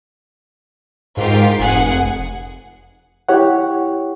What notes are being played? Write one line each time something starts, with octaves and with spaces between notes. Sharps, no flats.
G#2 F4 G4 A#4
F1 G#4 F#5
E4 G4 C#5 F#5